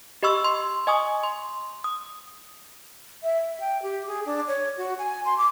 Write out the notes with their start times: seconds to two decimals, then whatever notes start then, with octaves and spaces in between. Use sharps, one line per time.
0.23 G4 D#5 B5 C#6 E6
0.44 C6
0.87 D#5 G#5 C#6 D#6
1.23 C6
1.84 D#6
3.23 E5
3.60 G5
3.82 G4
4.07 G#4
4.26 D4
4.48 C#5
4.77 F#4
4.98 G#5
5.25 C6
5.38 D6